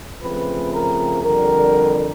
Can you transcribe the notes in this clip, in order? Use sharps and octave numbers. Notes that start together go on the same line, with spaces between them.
C#3 F3 A3 C4 B4
A#4
F2 D3 G3 A#4